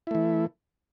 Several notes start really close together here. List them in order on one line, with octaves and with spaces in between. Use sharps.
E4 A3 E3